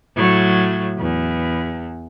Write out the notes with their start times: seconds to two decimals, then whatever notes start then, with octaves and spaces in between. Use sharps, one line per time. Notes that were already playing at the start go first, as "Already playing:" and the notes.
0.17 A2 F#3
0.99 E2